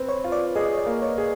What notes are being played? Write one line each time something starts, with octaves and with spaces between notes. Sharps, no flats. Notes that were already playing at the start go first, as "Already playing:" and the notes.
Already playing: C4 B4
C#5
F4
D5
G#4 D#5
C#5
D5
A#3
C#5
G#4